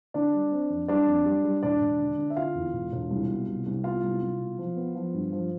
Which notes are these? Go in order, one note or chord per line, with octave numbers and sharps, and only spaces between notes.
D3 D4 D5
G3
C4
F2
G3 D4 D5
F2
G3
G3
E1 D4 D5
E1
D3
D3
E5
D3 F4 F5
E2
E1
E1
C2
B2
C2
C2
B3 F4 F5
C2
C2
B2
F3
B3
F3
G2
F3